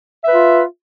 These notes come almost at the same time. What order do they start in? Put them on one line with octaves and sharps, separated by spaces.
E5 B4 F4